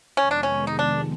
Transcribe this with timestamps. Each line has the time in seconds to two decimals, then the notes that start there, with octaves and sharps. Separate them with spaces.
0.17 F2 C3 D#3 G#3 B3 C#4
0.31 D4
0.43 C#4
0.67 D#4
0.79 D4